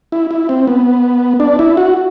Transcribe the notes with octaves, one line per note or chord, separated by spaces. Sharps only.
E4
E4
C4
B3
D4
E4
F#4